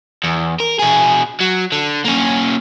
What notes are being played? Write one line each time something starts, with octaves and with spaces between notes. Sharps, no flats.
E2
A#4
B2 G#4
F#3
D3
A#3 C#4